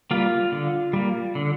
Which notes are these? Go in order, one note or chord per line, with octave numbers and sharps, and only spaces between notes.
G3 A#3 F4
D3
G3 A#3
D3